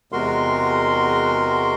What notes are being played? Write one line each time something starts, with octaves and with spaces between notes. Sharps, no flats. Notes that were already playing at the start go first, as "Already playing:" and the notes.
E2 C3 G#3 F#4 A#4 C6